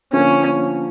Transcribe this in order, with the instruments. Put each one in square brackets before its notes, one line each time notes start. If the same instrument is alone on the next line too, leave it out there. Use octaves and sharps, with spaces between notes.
[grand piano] D3 F3 A#3 [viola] C#4